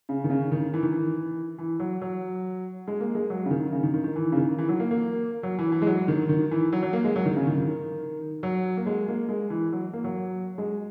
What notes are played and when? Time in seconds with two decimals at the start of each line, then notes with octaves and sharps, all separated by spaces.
0.09 C#3
0.24 D#3
0.30 C#3
0.52 D#3
0.74 E3
0.83 D#3
0.92 E3
1.58 E3
1.80 F#3
2.01 F#3
2.88 G#3
3.00 A#3
3.15 G#3
3.30 F#3
3.46 C#3
3.51 D#3
3.72 C#3
3.83 D#3
3.94 D#3
4.04 D#3
4.16 E3
4.32 C#3
4.37 D#3
4.58 E3
4.69 F#3
4.80 A#3
4.91 A#3
5.43 F#3
5.59 E3
5.72 E3
5.82 G#3
5.87 F#3
6.08 D#3
6.29 D#3
6.51 E3
6.72 F#3
6.83 F#3
6.93 A#3
7.04 G#3
7.16 F#3
7.26 D#3
7.36 C#3
7.47 D#3
7.58 D#3
8.43 F#3
8.77 A#3
8.86 G#3
9.08 A#3
9.29 G#3
9.50 E3
9.72 F#3
9.93 A#3
10.04 F#3
10.58 G#3